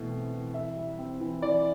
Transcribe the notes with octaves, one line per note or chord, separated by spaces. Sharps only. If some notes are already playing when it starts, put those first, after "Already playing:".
Already playing: B2 E3 A3
C4
E3
E3 E5
G3
C4
E3
E3 D5